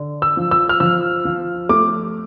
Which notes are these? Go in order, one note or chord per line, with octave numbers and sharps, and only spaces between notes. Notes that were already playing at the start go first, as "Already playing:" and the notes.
Already playing: D3
E6
F3
E6
F6
F3 E6
F3
A3 D6